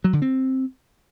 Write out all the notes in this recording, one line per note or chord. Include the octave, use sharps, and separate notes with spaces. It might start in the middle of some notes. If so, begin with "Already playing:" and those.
F#3
D3
C4